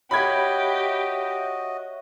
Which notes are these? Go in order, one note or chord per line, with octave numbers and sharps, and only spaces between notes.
F#4 G4 C#5 D#5 E5 B5 G#6